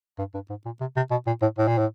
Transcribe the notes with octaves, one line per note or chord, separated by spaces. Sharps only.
G2
G2
G#2
A#2
C3
C3
B2
A#2
A2
A2
A#2
A2